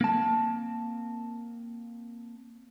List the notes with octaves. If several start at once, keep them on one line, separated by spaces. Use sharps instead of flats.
A#3 C4 A5